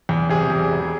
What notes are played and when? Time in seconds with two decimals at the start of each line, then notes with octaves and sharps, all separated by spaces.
0.09 E2
0.29 C3 G#4
0.50 E2
0.72 E1